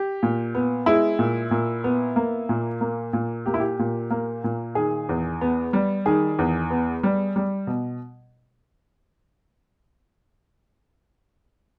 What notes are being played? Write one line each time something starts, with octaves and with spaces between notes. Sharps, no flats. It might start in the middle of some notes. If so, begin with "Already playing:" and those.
Already playing: G4
A#2
B3
G#3 E4
A#2
A#2
B3
A#3
A#2
A#3
A#2
A#3 G4
E4
G4
A#2
A#3
A#2
D#3 G#4
E2
B3
G3
D#3 G#4
E2
B3
G3
G3
B2